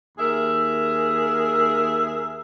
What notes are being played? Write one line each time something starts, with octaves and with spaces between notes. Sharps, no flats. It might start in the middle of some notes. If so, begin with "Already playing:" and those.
D#2 G#4 A#4 E5